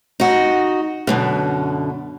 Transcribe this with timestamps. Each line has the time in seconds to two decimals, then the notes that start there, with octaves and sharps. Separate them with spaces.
0.20 D#4 F#4
1.07 F#2 B2 D3